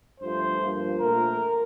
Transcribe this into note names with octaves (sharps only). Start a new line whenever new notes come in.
G2 F3 A3 C5
G2 F3 A#3
A#2 A3 A#4